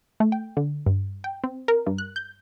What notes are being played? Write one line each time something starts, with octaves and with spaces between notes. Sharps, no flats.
A3
G5
D3
G2
G5
C4
A#4
G2
F#6
G6